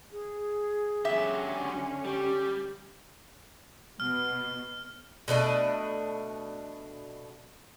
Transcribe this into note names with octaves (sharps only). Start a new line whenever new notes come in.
G#4
D3 F#3 C#4 G4 E5
G3 G4
B2 F6
B2 A3 D4 D#5